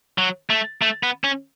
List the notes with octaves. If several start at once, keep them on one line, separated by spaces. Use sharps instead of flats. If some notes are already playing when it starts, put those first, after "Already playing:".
F#3
A3
A3
B3
C#4